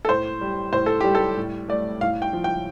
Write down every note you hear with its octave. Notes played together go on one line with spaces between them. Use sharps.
A4
A2 C5
G3
A2 C5
A4
G3 G4
A4
A2
A3 D5
A2 F5
G5
F3
G5